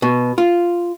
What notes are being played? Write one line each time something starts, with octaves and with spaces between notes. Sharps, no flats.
B2
F4